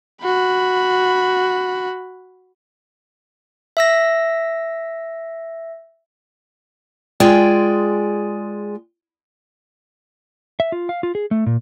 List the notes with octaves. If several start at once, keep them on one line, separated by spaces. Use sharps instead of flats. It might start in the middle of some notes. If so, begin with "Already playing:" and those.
F#4 B5
E5 E6 A#6
G#3 F4 G#4 D5 G5
E5
F4
F5
F4
G#4
A3
A#2